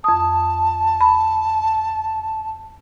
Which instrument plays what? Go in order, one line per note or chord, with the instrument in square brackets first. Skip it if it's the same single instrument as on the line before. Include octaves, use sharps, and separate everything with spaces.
[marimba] F2 D#6 [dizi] A5
[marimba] B5